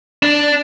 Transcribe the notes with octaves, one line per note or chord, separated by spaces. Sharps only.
D4